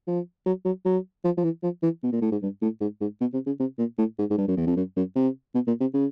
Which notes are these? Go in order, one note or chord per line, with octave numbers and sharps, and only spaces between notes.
F3
F#3
F#3
F#3
F3
F3
E3
F3
E3
B2
A#2
A2
G#2
G2
A2
G#2
G#2
B2
C3
C#3
C3
A#2
A2
G#2
G#2
G2
F#2
E2
F2
F#2
F#2
C3
B2
A#2
C3
C#3